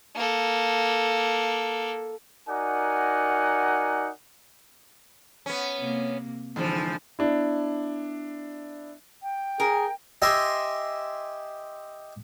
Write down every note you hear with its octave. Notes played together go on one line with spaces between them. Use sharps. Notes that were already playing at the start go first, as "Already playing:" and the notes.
A#3 A4
D#4 F#4 A#4 D5 F#5 G#5
B3 C#4
C3 A#3
G#2 D3 E3 F3
B3 D4 E4
G5
G#4 A#4
G4 D#5 E5 G#5 C6